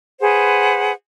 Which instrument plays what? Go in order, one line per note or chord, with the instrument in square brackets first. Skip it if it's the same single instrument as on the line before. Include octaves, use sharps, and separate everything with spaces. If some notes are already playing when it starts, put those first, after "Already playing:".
[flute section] G#4 B4 C5 F#5